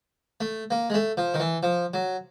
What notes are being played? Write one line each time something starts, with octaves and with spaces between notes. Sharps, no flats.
A3
A#3
G#3
A3
F3
D#3
E3
F3
F#3